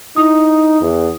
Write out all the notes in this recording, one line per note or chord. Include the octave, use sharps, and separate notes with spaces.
D#4 E4 D#6
E2